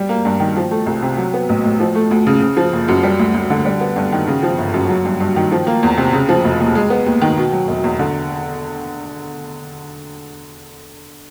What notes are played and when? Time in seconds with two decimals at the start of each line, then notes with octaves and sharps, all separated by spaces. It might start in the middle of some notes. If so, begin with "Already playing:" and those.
Already playing: G3
0.09 A#3
0.25 G2
0.40 D#3
0.56 F3
0.71 A3
0.86 C2
1.02 C3
1.17 F#3
1.34 B3
1.49 A1
1.64 A2
1.80 F3
1.95 A3
2.11 D2
2.27 C#3
2.41 C#3
2.57 F3
2.73 F#1
2.88 F#2
3.03 G3
3.19 D2
3.34 D2
3.50 D3
3.65 G3
3.81 B3
3.96 G2
4.12 D#3
4.27 C#3
4.43 F3
4.58 G1
4.74 F#2
4.89 F#3
5.05 G2
5.20 G2
5.36 D#3
5.52 F3
5.67 A#3
5.83 E2
5.97 C3
6.13 C#3
6.29 F3
6.45 F1
6.60 D#2
6.75 G#3
6.90 B3
7.06 D#2
7.21 D#3
7.37 B2
7.52 F#3
7.68 E1
7.84 E2
7.99 D3